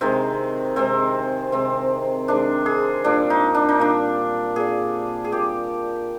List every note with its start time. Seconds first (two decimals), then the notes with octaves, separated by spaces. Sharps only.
0.01 C3 D#3 G#3 C4
0.76 C3 D#3 G#3 C4
1.52 C3 D#3 G#3 C4
2.28 C3 D#3 G#3 D4
2.66 G#4
3.04 A#2 G3 D4
3.30 D#4
3.54 D4
3.69 D#4
3.80 A#2 G3 D4
4.56 A#2 G3 G#4
5.24 G#4
5.32 A#2 G3 G4